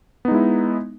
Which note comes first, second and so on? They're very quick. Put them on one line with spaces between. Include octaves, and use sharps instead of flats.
B3 D#4 G#3 E4